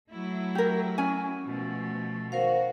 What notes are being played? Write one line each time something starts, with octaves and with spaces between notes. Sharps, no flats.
F#3 A3 E4
G4 A#4
C#4 G#5
B2 F3 A3
D#3 F#4 A#4 C5 F5